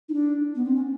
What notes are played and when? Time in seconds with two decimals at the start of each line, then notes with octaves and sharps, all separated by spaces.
0.09 D#4
0.14 D4
0.55 B3
0.65 C4
0.75 C#4